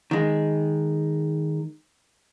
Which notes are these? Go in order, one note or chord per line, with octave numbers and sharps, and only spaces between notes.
D#3 G#3